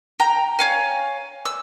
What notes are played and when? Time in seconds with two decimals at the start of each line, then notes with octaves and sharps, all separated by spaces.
0.20 G5 A#5
0.59 C#5 F5 G#5
1.45 E6